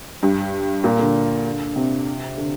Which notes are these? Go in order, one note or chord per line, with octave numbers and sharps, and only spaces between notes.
G2
A#2
D3
C3
D3